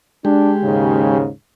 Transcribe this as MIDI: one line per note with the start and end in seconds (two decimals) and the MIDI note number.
0.25 1.18 56
0.25 0.52 62
0.25 1.18 67
0.62 1.29 39
0.62 1.29 44
0.62 1.29 49